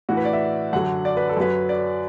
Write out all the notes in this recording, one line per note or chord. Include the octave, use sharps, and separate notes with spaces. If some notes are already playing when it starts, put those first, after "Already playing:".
A2 E3 F#4
B4
D5
E5
F#2 D3 F#3 F#5
D5
B4
A4
F#2 F#3 B4
D5